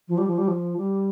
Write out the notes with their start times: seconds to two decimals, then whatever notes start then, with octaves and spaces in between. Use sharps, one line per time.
0.08 F3
0.18 G3
0.27 F3
0.38 G3
0.48 F3
0.77 G3